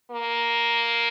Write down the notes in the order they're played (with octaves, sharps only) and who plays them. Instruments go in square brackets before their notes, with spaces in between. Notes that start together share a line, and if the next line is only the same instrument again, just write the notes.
[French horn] A#3